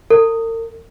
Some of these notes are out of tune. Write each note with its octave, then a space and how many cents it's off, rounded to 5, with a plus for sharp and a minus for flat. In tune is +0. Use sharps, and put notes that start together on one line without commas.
A#4 -45